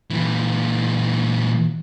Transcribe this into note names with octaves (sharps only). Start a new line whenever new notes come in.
A#2 E3